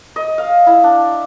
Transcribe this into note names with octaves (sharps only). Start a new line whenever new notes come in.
D#5
F5
E4
D4